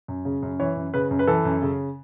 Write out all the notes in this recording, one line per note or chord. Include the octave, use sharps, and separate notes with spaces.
F#2
C#3
F#2
E3 C#5
F#2
C#3 B4
F#2
B4
E3 A4
F#2
C#3